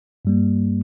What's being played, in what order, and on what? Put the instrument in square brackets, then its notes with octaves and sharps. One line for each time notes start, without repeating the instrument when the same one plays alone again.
[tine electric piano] G2 G3 A#3